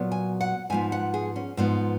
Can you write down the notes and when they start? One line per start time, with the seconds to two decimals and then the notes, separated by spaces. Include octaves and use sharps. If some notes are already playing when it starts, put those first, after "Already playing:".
Already playing: A#2 F#3 B3
0.12 G#5
0.41 F#5
0.70 G#2 F3 B3 G#5
0.92 F#5
1.14 G#4
1.36 C#4
1.57 G#2 F3 B3